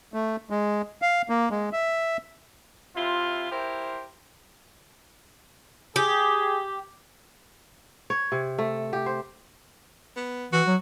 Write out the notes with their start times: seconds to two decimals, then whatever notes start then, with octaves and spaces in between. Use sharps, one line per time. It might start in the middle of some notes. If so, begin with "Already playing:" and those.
0.13 A3
0.50 G#3
1.02 F5
1.29 A#3
1.51 G#3
1.73 E5
2.96 C3 E4 F4
3.51 E4 G4 A#4 C5
5.96 G4 G#4
8.10 C#5
8.32 C3
8.58 A3
8.93 G4
9.06 C5
10.16 B3
10.53 E3 F#4
10.67 F#3